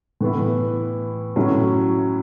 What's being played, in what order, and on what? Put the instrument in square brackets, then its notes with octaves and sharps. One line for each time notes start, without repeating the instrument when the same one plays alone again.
[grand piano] A2 E3 B3 E4
A2 F#3 C#4 E4